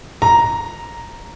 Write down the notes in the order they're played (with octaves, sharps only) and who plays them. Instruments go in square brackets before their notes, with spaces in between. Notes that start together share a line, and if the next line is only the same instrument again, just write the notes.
[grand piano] A#5